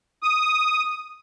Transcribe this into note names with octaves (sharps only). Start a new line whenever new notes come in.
D#6